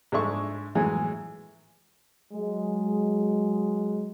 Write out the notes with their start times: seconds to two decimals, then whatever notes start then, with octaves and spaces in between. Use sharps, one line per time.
0.12 G#2 G#3 D4 A4 E5 C#6
0.75 A2 E3 F#3 G#3
2.33 F#3 G#3